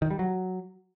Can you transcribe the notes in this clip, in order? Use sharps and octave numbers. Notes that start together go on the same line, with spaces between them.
D#3
G3
F#3